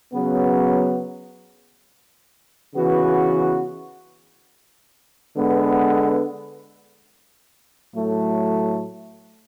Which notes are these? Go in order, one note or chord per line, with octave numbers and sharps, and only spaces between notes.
C#3 F#3 B3
C#3 E3 B3 F#4 B4
D3 G#3 B3
A2 F#3 A3